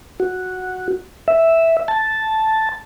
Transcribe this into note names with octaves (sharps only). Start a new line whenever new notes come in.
F#4
E5
A5